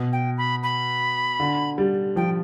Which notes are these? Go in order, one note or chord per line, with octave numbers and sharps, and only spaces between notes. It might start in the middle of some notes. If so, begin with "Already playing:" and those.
Already playing: B2
G5
B5
B5
D3
G3
F3 G5